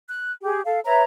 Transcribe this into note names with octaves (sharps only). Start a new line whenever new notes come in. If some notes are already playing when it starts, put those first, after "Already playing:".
F#6
G4 G#4
A4 F5
B4 C#5 E5 A#5